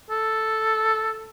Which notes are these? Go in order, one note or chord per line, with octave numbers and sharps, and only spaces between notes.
A4